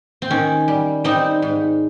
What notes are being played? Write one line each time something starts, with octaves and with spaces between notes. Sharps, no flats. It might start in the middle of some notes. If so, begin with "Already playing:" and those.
C4
D#3 C#4
G3
G3 C4 D#4
G#2